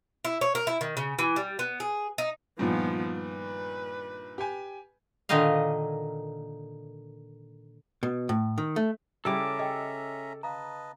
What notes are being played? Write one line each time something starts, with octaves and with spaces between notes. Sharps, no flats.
E4
C#5
A#4
E4
D#3
C#3
E3
G3
B3
G#4
D#4
G2 A#2 D#3 F3 B3
B4
G4 G#5
A#2 D3 D#3 D#4 D#5 F5
B2
A2
D#3
A3
C#3 G3 C#4 E4 A4 E5 A#5 D6
G#4 D#5 G5
B4 D#5 F5 A5 A#5